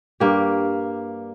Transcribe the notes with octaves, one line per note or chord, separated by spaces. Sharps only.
G2 A#3 G4